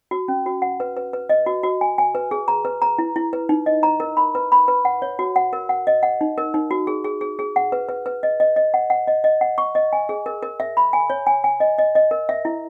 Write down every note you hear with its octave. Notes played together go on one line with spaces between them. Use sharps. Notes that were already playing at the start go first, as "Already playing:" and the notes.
F#4
C#4
F#4
F#5
B4
B4
B4
D#5
F#4
F#4
G#5
G#5
B4
G#4
A#5
B4
A#5
E4
E4
B4
D#4
D#5
A#5
A#4
B5
B4
B5
B4
F#5
C#5
F#4
F#5
A#4
F#5
D#5
F#5
D#4
A#4
D#4
F#4
G#4
G#4
G#4
G#4
F#5
B4
B4
B4
D#5
D#5
D#5
F#5
F#5
D#5
D#5
F#5
C#6
D#5
G#5
G#4
A#4
A#4
E5
B5
G#5
C#5
G#5
G#5
D#5
D#5
D#5
A#4
E5
E4